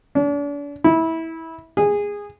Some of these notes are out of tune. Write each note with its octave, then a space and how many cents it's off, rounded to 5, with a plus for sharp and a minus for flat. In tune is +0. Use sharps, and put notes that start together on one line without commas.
D4 -40
E4 -20
G#4 -15